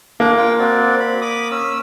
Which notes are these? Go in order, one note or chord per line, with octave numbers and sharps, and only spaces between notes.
A#3 D4
F4 G5
C4 F#4 D5
B5
B5 D6 D#6
C#4 E6